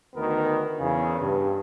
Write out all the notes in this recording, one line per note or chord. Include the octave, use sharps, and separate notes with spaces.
D2 D#3 B3 A#4
E2 C#3
G2